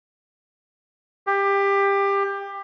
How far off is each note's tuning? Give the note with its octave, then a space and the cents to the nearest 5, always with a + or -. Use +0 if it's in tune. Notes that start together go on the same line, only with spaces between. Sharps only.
G4 +20